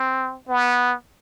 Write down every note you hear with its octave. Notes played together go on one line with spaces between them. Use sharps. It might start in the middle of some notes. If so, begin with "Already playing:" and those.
Already playing: C4
B3